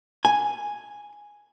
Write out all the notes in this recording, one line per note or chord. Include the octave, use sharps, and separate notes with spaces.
G#5